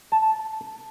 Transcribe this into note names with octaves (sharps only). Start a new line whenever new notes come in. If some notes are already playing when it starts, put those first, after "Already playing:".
A5